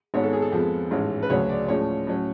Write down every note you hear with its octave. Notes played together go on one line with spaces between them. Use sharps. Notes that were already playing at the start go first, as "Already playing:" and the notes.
G#1 G#2 G#3 B3 C#5
A4
G#4
A4
F2 F3 G#3 B3
A1 G#2 G#3 C#4
B4
D2 C#3 F#3 C#5
D5
A2 F3 G#3 C#4 C#5
A2 F#3 C#4